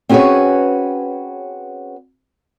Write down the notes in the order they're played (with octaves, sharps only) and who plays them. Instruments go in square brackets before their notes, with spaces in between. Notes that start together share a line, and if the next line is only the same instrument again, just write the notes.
[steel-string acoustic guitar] C4 C#4 F#4 G#4 B4 C#5